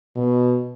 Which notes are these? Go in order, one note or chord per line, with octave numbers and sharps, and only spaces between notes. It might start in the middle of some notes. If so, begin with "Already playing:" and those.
B2